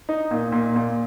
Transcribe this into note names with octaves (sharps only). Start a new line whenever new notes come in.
D#4
A#2
A#2
A#2